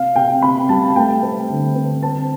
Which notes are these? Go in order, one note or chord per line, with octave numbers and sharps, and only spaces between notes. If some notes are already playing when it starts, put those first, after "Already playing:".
Already playing: C3 F5
C3 G5
C3 B5
G3 A5
A3 G5
C4
D3
C4
C4 A5